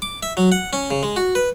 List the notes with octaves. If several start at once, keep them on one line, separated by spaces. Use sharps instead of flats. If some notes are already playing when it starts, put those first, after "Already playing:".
D6
E5
F#3
F#5
C#4
C#3
G#3
F#4
B4